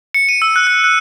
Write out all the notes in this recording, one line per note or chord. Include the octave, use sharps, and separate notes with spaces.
C#7
D#7
E6
F#6
F#6
F#6